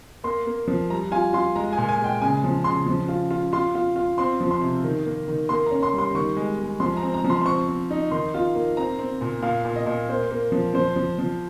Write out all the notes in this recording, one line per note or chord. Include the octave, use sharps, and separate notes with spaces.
A#3 C6
A#3
F3
G3 A#5
F4 G#5
F4 C6
G#3 A#5
G#5
A#2
G#5
G#3 G5
C#3 G#5
F3
C#3 C6
F3
F4
F4
F4 C6
F4
F4
C4 C6
F3
C6
C3
D#3
A#3
D#3
A#3 C6
A#5
C#4
C6
G3 C6
D#3 C#6
G#3
G#3
F3 C6
A#5
C4
A#5
F3
C6
C6
C4 C#6
C4
D#4
D#3 C6
F4
A#3
C4 A#5
C4
A#2
A#2 F5
A#2
D#5
A#2
A#3 C5
A#3
F3
F3 C5
F3
F3